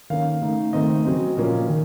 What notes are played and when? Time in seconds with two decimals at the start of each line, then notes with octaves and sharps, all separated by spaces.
0.10 D#3 A#3 C#4 F5
0.42 C#3 A3 D#4
0.73 D#3 A3 C4 D#4 D#5
1.05 C#3 F#3 C4
1.37 A#2 F3 A#3 C#4
1.68 D#3